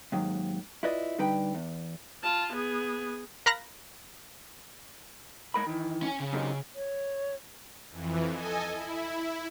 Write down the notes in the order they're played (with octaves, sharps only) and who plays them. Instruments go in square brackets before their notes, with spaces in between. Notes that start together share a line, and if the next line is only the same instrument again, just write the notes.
[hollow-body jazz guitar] D#2 G#2 D#3 F#3
E4 F4 B4 D5 D#5
D3 G3 D#4 B4 G5 B5
E2
[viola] F4 A5
B3 G#4
[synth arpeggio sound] A#4 F5 A#5 B5 F#6 A#6
[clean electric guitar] G#3 A#4 B5
D#3 E3
[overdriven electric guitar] C#4 G#5
C#3
[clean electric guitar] F#2 C3 D#3
[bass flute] C#5
[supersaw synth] F2 E3
A4 D#5 G#5
E4